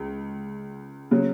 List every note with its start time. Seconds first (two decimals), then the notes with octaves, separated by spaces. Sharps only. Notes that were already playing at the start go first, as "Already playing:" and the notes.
Already playing: C#2
1.11 C#3 F#3